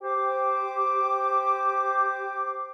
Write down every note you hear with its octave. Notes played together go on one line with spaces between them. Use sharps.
G4 C5 G5 D6